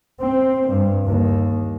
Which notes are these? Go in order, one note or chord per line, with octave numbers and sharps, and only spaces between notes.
C4
G2
D#2